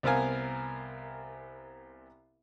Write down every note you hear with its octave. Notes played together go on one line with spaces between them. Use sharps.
C2 B3 C4 A#4 F5 G#5